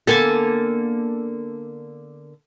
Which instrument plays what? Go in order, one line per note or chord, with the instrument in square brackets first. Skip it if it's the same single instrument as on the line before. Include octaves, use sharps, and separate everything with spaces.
[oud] D3 A#3 B3 [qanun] A4 G#5 A5